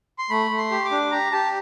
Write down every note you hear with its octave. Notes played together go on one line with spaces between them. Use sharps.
C6
A3 B5
A3
C6
G4
D6
D4
G4 A#5
G4 A5